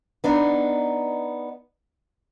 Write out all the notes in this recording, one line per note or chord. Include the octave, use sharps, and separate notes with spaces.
B3 D4 D#4 B4